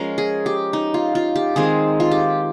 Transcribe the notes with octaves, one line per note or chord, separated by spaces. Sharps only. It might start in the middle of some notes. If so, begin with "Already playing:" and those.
Already playing: F3 G#3 C#4 A#4
G#4
G4
D#4
F4
F4
G4
D#3 G#3 C4 G#4
F4
G4